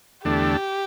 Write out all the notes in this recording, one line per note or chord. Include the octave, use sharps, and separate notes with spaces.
E2 D3 A3 D4 G4